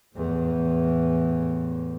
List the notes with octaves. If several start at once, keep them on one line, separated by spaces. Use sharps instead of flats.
E2 A2